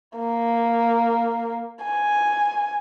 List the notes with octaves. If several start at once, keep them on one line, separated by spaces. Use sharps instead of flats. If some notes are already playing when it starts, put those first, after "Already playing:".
A#3
G#5